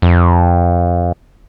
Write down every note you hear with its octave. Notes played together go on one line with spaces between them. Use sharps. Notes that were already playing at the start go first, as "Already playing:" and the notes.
F2